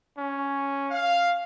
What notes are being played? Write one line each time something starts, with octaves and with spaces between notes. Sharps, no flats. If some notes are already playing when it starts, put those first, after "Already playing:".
C#4
F5